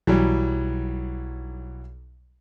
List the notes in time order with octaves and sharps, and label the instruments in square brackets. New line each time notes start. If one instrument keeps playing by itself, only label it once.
[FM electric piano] B1 [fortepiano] E3 F#3 G3